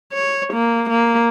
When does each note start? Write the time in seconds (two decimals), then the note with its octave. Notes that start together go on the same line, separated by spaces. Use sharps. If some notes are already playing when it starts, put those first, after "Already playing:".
0.14 C#5
0.54 A#3
0.90 A#3